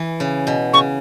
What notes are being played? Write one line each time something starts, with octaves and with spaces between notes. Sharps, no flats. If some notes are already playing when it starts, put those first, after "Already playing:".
Already playing: E3
C#3
B2
C#3 C#6